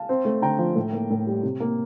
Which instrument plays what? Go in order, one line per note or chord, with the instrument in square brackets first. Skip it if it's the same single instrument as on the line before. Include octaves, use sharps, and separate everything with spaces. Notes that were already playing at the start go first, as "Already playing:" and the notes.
Already playing: [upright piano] F5 A5
C4
A3
D3 G5 A#5
F3
A2
A#3
A2
G3
C3
A#3